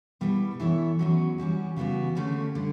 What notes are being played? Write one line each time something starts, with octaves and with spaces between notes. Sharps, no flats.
B2 G3 B3 E4 B4
E3 B3 E4 A4 C#5
E2 B2 F#3 C#4 F#4
E3 G3 C#4 F#4
C#3 E3 G3 B3 F#4
D3 A3 C#4 G4 D5
D3 G3